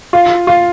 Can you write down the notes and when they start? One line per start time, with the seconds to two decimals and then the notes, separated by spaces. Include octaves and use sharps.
0.13 F4
0.47 F4